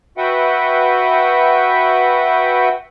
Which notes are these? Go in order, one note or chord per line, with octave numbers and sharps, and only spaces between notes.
F#4 B4 E5 F#5 G5